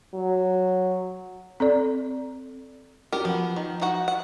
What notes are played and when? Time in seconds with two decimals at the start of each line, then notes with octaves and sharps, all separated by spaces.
0.14 F#3
1.60 C4 A4 D5
3.12 C#4 F#4 G4 A#4
3.25 F3 B3
3.56 D#3
3.81 D#4 F#4 F#5
4.08 F#5